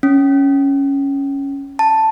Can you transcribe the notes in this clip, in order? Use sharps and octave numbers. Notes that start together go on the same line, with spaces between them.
C#4
A5